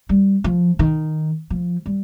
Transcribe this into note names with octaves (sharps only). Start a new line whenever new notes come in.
G3
F3
D#3
F3
G3